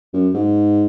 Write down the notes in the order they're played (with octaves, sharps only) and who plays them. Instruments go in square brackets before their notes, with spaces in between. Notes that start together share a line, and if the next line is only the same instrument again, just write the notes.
[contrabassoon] F#2
G#2